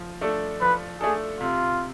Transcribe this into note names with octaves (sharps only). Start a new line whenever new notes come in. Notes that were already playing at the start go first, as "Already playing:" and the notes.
Already playing: F3
A3 D4 A4
F3 B4
A3 D4 G#4 A4
C3 F4